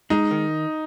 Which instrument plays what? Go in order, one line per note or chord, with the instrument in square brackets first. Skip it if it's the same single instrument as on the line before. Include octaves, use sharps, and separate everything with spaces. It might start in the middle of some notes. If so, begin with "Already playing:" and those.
[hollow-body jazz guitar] G#3 [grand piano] D#4
[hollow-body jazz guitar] D#3